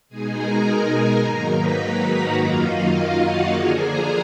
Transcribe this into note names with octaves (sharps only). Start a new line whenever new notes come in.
B2 G#3 D#4 G#4 G#5
A#4 A#5
G#4 G#5
G#2 D#3 F#3 A#3 D#4 A#4 A#5
B4 B5
B4 B5
F#4 F#5
F#2 D#3 F#3 A#3 D#4 F4 F5
D#4 D#5
F4 F5
F#4 F#5
D3 F3 A#3 D4 G#4 G#5
A#4 A#5